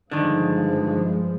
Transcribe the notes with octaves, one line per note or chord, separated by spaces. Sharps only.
G2 D3 D#3 F3 G#3